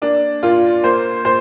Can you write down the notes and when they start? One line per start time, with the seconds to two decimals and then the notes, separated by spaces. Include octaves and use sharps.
0.02 A#3 D4
0.43 A#2 F4
0.84 A#3 C5
1.25 A#2 C5